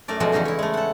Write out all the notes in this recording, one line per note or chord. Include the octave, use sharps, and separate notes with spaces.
F#2 A3 A#4 D5
F2 B2 F#3 G#3
E2 C#3 C#4 D#4 A#5
E4 C#5
G#3 A3
A4 F#5